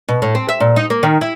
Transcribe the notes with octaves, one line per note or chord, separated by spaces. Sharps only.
B2
A2
C4
E5
A#2
D#4
A#3
D#3
E4